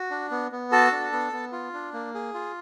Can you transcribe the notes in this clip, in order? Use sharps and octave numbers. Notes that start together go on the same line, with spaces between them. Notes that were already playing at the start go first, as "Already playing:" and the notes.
Already playing: F#4
D4
B3
B3
F#4 A4 A5
D4
B3
B3
F4
D4
A#3
G#4
F4